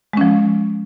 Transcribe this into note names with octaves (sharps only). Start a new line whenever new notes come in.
F3 G#3 C#4